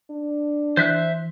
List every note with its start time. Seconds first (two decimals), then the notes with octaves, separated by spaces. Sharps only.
0.11 D4
0.77 E3 C5 E5 F#6